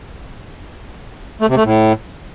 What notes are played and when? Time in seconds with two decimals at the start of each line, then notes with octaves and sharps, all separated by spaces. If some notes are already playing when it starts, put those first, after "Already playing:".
1.41 A3
1.49 C3
1.57 A3
1.65 A2